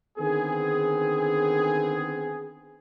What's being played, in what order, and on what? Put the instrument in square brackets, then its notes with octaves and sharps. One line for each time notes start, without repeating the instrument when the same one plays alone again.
[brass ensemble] D3 D#3 B3 C4 G#4